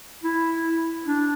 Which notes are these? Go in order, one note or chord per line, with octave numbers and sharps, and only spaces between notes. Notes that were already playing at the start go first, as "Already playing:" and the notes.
E4
D4